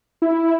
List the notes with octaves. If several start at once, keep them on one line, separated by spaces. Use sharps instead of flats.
E4